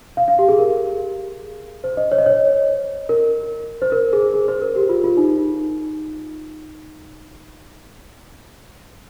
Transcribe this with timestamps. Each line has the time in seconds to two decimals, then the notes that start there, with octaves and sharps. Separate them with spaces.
0.17 F5
0.28 F5
0.39 G4
0.48 G#4
0.59 A#4
1.84 C5
1.97 D#5
2.12 C#5
2.18 D#5
2.26 C#5
3.09 A#4
3.82 C5
3.92 A#4
4.13 G#4
4.34 G#4
4.48 C5
4.62 A#4
4.76 G4
4.89 F4
5.04 F4
5.17 D#4